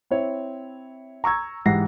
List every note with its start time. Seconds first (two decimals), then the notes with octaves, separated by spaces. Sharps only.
0.11 C4 E4 C#5
1.24 A#5 C#6 E6 G#6
1.65 G#2 E3 G4 F#5 A#6 C7